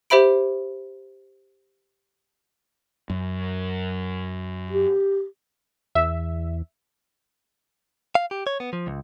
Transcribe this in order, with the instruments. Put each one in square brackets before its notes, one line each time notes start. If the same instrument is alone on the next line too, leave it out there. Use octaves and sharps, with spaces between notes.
[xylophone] G4 C5 E5 B5 D7
[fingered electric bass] F#2
[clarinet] G4
[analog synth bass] E2 [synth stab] E5
[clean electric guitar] F5
G4
C#5
B3
F3
C#2